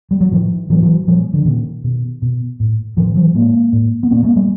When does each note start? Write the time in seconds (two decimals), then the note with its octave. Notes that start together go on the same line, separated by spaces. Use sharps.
0.11 G3
0.21 F#3
0.31 A2 D#3 F3
0.70 A2 E3 F#3
0.82 E3 F#3
1.07 A#2 F3 G3
1.33 D3
1.45 A#2 D#3
1.84 B2
2.22 B2
2.60 A2
2.97 A2 D#3 F3
3.15 E3 F#3
3.34 A2 G#3 A#3
3.72 A2
4.03 B3
4.10 A#2 A#3 C4
4.23 G#3 A#3
4.36 G3 A3